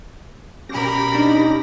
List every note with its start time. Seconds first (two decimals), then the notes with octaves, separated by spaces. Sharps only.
0.69 B2 C#4 G4 A#4 B5 A#6
1.15 D4 D#4